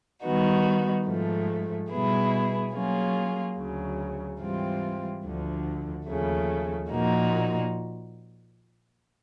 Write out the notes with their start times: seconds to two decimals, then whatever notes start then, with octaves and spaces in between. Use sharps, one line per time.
0.23 D#3 G3 B3 D#4 F#4
1.07 G#2 F3 A3
1.90 B2 G3 B3 E4 G#4
2.73 F#3 A#3 C#4 F4 G#4
3.56 D2 C#3 F#3
4.39 G#2 E3 G3 C4 F4
5.23 D2 D3 F3
6.07 D#2 C#3 F3 A3
6.90 A#2 F3 A#3 D#4 F#4